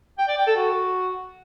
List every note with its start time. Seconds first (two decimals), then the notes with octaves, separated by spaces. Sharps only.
0.18 G5
0.28 D5
0.37 G5
0.47 A4
0.56 F#4